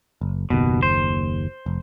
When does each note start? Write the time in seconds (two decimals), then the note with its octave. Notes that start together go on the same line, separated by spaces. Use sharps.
0.21 F#1
0.50 F#1 D#2 B2
0.83 C5
1.66 F1